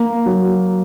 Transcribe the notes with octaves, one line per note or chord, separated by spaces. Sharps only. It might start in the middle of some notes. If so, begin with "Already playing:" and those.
Already playing: A#3
F#3